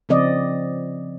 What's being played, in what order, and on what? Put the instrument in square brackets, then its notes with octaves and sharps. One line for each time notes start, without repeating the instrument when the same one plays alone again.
[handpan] C#3 F3 C4 D5 D#5